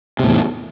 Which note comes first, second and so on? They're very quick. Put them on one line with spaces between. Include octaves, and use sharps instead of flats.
C3 A2 E2